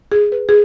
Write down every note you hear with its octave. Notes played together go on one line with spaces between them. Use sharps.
G#4
B4
G#4